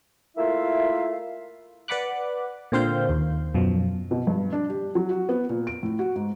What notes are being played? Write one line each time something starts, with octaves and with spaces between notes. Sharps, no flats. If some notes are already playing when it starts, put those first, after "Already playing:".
A3 A#3 E4 F4 E5 F5
B4 D5 F#5 B5 D6 F#6
A#2 D3 C4 C5 F5 G6
D#2
F#2 B2 F3
B2
G2
D4
G4
F#3
F#4
B3
A#2
D7
A2
F#4
G#2